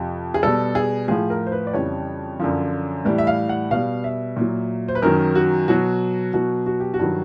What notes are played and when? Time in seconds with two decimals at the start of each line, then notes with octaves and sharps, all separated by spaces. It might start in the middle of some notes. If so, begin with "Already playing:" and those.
Already playing: F2 C3 F3
0.34 G#4
0.43 B2 G3 A4
0.75 G#4
1.08 A2 F3 G#4
1.30 A#4
1.47 C5
1.52 B4
1.67 D5
1.73 F2 C#3 E3 G3 C#5
2.40 F#2 D3 F3
3.05 A2 E3 G3
3.18 E5
3.27 F5
3.49 F#5
3.71 B2 G3 F5
4.04 E5
4.37 A#2 F#3
4.88 C5
4.95 B4
5.02 F#2 D#3 F#3 A#4
5.35 F#4
5.68 B2 F#3 F#4
6.33 B2 F#3 F#4
6.66 F#4
6.80 G4
6.94 F#4
6.99 G2 D#3 F#3